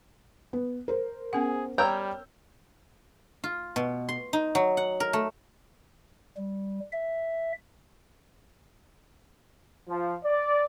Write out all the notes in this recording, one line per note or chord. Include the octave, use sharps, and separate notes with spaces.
B3
A#4 C5
B3 C#4 G#4 F#5
G3 A#4 C#5 G5 E6 G6
F4
B2
C6
D#4
F#3
F#5
A#4
A3
G3
E5
F3
D5